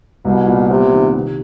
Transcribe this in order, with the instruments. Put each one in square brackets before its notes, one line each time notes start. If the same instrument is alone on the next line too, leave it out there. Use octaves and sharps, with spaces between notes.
[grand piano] C2 [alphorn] B2
[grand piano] A#2
[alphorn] C3 [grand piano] B3
[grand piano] D#3
C3